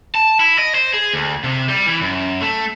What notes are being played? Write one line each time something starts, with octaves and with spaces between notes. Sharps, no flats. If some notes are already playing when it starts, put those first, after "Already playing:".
A5
E4
D#5
C5
G#4
D2
C3
G3
E3
F#2
A3